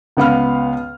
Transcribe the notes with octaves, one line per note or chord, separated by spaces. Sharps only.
C#2 B3 F5 F6